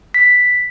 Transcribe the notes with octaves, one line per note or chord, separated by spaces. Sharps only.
B6